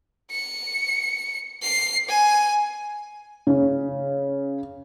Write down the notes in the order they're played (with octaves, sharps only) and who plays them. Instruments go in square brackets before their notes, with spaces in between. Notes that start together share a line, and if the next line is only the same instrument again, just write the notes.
[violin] C#7
C7
G#5
[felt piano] C#3